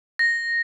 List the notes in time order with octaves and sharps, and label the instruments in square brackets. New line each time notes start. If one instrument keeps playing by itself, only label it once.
[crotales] A#6